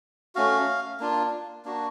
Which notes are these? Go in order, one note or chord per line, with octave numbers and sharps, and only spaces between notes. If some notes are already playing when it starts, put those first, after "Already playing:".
A3 C#4 F#4 F5
A#3 D4 F4
A#3 D4 F#4